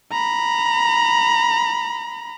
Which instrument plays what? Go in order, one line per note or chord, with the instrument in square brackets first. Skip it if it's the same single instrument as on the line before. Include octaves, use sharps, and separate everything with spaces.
[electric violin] A#5 B5